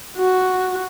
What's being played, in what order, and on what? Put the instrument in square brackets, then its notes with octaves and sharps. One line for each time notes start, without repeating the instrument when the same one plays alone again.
[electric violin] F#4